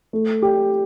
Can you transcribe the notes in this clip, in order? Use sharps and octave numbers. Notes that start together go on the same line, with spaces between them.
A3
G4